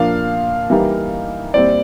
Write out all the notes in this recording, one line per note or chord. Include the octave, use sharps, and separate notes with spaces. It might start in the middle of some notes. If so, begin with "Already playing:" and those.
Already playing: A#2 F3 A#3 D4 F5
E3 G3 A#3 D#4 G4
A#2 G3 C4 E4 D5